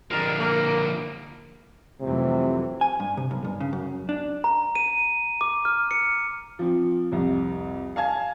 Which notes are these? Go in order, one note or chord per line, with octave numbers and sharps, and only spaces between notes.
D3 F3 G3 G#3 A#4
A#3
F1 C3 E3 F#3
G#5
G2
C3
B1
G2
C#3
F#2
D4
A#5
D#7
D6
F6
C#7
F3 C4
C2 F2
F5 G#5 A5 G#6